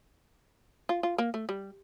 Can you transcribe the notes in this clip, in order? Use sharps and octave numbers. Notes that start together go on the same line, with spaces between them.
F4
F4
A#3
A3
G3